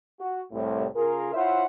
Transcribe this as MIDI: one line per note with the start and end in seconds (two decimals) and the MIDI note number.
0.20 0.40 66
0.51 0.85 36
0.51 0.85 45
0.96 1.30 49
0.96 1.30 65
0.96 1.30 68
0.96 1.30 70
1.34 1.65 64
1.34 1.65 65
1.34 1.65 72
1.34 1.65 73
1.34 1.65 76
1.34 1.65 78